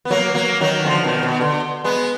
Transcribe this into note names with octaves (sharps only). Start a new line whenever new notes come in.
B3
F#3 A#3
F#3 A#3
D#3 F#3
D3 F3
B2 D#3
B2
D3
G#3 B3